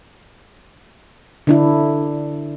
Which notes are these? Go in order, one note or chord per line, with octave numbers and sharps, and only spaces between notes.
D3 D4 E4